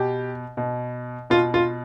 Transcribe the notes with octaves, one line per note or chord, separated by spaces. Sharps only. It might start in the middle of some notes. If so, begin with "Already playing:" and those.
Already playing: B2 G4
B2
B2 F4
F4